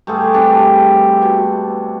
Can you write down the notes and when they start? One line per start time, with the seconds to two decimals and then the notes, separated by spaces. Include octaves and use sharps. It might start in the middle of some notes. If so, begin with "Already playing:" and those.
0.07 G2 A3 F4 G#4
0.34 C3 E3 D4 B5
1.22 B2